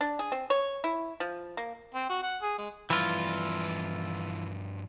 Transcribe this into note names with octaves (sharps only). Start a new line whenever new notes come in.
D4
G#4
C4
C#5
E4
F3
A#3
C4
F#4
F#5
G#4
G#3
G2 E3 F3 F4